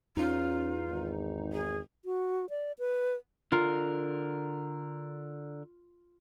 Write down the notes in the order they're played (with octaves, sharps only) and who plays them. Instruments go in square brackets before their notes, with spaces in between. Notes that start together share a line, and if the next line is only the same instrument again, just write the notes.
[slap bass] E2 [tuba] C#4 [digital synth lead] D#4 [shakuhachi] F4
[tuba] G#1
[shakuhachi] G#4
[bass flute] F#4
D5
B4
[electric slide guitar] D3 A#4 [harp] F4